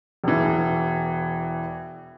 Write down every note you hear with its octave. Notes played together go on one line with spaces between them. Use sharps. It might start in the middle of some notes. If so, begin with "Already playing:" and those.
E1 E3